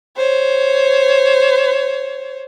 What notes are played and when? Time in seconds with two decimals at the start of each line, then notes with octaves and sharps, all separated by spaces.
0.17 C5 C#5